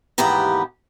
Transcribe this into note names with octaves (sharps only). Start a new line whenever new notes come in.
D#2 G#2 E3 B3 G4 A#5